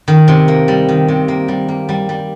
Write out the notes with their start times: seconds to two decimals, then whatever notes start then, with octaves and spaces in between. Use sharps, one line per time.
0.08 D#3
0.28 C3
0.48 A#3
0.68 G3
0.89 D#3
1.08 C3
1.28 A#3
1.48 G3
1.68 A#3
1.89 G3
2.09 G3